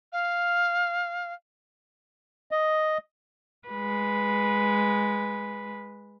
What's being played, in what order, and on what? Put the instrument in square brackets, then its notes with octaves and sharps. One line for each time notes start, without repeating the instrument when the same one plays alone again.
[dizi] F5
[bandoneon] D#5
[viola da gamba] G#3 B4